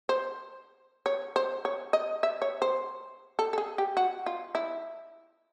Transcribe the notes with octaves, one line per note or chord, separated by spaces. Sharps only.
C5
C#5
C5
C#5
D#5
E5
C#5
C5
A4
A4
G#4
G4
F#4
F4
E4